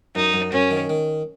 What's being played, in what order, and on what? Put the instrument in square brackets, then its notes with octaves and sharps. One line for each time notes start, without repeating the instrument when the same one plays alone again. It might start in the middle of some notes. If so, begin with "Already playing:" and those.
[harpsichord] F#2 [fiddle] D#4
[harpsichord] F#2
[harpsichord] F#2 [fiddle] C#4
[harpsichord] D#3
D#3